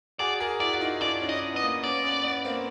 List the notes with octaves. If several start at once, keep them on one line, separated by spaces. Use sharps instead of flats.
F#4 G#4 D5
G#4 A#4
E4 F#4 D5
F#4
D#4 F4
D4 E4 D5
C#4 D#4
D#5
D4 E4
B3 D#5
A#3
B3 C#4 D5
B3 C#4
B3
A#3 C4